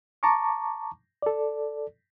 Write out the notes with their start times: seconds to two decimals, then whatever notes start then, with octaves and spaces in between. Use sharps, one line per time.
0.23 A5 A#5 C#6 D6
1.22 A4 D5